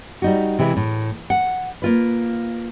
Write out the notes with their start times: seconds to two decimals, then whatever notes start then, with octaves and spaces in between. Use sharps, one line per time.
0.22 G3 D#4 F#4
0.59 C3 E3 G#3 E4
0.77 A2
1.30 F#5
1.82 A#3 F4 B4